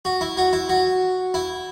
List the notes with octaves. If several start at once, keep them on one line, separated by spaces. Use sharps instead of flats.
F#4
E4
F#4
E4
F#4
E4